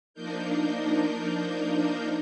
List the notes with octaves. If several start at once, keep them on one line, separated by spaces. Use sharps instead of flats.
F3 A#3 D4 D#4 A#4 G6